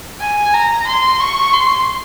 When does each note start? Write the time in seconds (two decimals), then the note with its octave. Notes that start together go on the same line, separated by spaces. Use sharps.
0.21 G#5
0.54 A#5
0.88 C6
1.21 C#6
1.54 C6